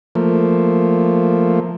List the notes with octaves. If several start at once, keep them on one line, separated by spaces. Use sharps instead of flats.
F3 A3 A#3